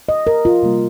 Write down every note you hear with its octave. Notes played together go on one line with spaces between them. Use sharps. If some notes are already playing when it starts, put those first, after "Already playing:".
D#5
A#4
F4
C3 G3 A#3